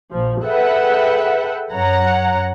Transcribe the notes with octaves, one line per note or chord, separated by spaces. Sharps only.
A#1 F3
G#4 A4 B4 E5 F#5 G5
F#2 C#5 F#5 A#5